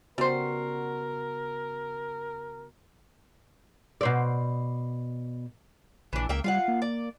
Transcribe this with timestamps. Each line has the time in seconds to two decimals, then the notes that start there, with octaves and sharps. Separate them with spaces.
0.18 C#3 G3 B3 F#4 A#4 C5
4.01 B2 C5 D5
6.13 A#1 E3 D4
6.29 C#2 A#3 E5 G5
6.44 G3 F4 F5 F#5
6.68 A#3
6.82 D5